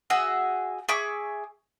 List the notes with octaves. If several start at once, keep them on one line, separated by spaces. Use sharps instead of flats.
F#4 G#4 E5 E6
G#4 E5 C#6 D6